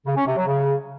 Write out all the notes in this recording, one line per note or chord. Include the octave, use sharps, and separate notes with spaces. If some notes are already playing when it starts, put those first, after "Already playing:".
C#3
C#4
C3
F#3
C#3